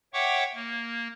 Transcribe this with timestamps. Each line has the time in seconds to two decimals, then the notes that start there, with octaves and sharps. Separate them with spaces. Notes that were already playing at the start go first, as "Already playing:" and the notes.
0.13 C#5 E5 F#5 G5 C#6 D6
0.55 A#3